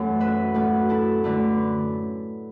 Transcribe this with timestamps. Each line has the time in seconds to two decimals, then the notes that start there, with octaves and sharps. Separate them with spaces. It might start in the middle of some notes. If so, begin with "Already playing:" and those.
Already playing: F#2 E3 A3 A4
0.20 B4 E5
0.54 A2 A3 F#4 B4
0.89 E4 A4
1.24 D3 A3 B4